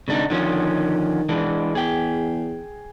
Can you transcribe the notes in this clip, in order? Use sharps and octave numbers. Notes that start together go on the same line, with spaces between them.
G#1 C#3 D4 D#4
D3 D#3 F3 C#4
E3 G#3 D4
E2 G#4 G5